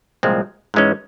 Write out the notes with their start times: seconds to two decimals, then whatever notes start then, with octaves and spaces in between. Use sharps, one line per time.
0.23 C2 A#2 F3 G#3 C4
0.74 G#2 E3 G#3 C#4